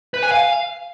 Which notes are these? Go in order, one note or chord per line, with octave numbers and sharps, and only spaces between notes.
B4
G#5
F5